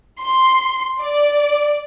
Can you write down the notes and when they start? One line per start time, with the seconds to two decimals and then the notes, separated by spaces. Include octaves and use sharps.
0.20 C6
1.01 D5